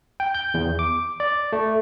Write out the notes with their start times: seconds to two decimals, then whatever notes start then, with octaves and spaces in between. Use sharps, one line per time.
0.20 G5
0.35 G6
0.54 E2
0.79 D6
1.20 D5
1.53 A3